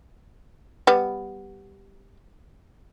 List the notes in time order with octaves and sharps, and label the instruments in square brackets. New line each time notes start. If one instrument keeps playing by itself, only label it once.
[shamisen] G3 B3